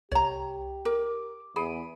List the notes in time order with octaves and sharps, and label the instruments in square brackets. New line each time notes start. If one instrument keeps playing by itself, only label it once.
[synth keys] C2 [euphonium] G4 [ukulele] C#5 A#5
[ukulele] A#4 [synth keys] D6
[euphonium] E2 [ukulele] G#4 [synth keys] B5 D7 D#7